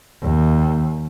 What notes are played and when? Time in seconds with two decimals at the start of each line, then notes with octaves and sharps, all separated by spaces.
0.23 D#2